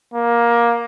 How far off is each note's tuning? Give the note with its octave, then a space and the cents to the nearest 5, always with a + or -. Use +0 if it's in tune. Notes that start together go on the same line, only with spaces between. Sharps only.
A#3 +15